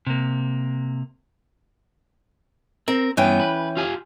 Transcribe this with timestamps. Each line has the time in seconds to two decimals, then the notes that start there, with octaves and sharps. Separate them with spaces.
0.07 C3 A#3
2.88 C4 A#4
3.17 G2 E3 B3 C#4 G5
3.40 B4
3.77 F4 G4 G#5